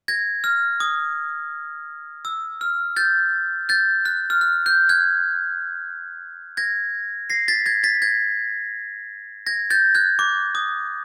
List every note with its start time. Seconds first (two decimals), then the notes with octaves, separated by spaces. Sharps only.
0.08 G#6 A#6
0.44 F6
0.80 D#6
2.25 E6
2.61 F6
2.96 G6 A6
3.69 G6 A6
4.05 F#6
4.30 F6
4.41 F#6
4.66 G6
4.89 F#6 G#6
6.57 G#6 A#6
7.30 A#6 C7
7.48 A6 B6
7.66 G#6 A#6
7.84 A6 B6
8.02 G#6 A#6
9.46 G#6 A#6
9.70 G6 A6
9.95 F#6 G#6
10.19 D6
10.55 D#6